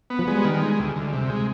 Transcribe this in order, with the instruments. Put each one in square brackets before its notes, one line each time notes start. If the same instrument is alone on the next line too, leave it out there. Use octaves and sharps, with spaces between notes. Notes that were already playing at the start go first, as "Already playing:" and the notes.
[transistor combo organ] B3
[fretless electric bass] F3
[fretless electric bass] G3 [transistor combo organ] G#3
[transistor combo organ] D#3
G#3
D2
D2
C3
G#3